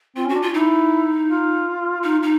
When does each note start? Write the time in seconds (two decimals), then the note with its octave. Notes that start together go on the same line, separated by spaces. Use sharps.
0.16 C4 F4
0.26 C#4
0.29 F#4
0.35 D4
0.42 F4
0.54 D#4 E4
1.29 F4
2.04 D#4
2.23 D#4